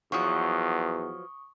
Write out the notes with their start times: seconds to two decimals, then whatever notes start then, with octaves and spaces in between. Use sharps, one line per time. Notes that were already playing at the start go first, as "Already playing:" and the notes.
0.12 E2 F3 F#3 B3 C#6 D#6